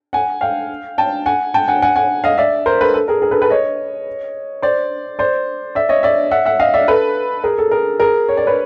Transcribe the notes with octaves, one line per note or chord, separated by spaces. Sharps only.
F#5 G#5
F5 G5
G5 A5
F#5 G#5
G5 A5
F#5 G#5
F#5 G#5
F#5 G#5
D#5 F5
D5 E5
A#4 C5
A4 B4
A4
G#4 A#4
G#4 A#4
A4 B4
A4 B4
C#5 D#5
C5 D5
C5 D5
D5 E5
C#5 D#5
D5 E5
E5 F#5
E5 F#5
D#5 F5
D5 E5
A4 B4
G#4 A#4
A4
G#4 A#4
G#4 A#4
C#5
D5
B4 C#5